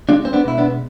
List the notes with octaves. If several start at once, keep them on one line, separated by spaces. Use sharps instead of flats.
G#3 D4 F4
C4
B3 D4
B2 E4
B3 D4